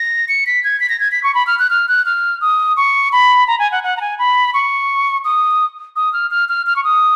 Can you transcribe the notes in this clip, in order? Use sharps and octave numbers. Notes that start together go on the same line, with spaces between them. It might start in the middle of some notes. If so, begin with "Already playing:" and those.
Already playing: A#6
C#7
B6
G#6
B6
A#6
G#6
B6
C#6
B5
F6
F#6
F6
F#6
F6
D#6
C#6
B5
A#5
G#5
F#5
F#5
A#5
G#5
B5
C#6
D#6
D#6
F6
F6
F6
F6
C#6
D#6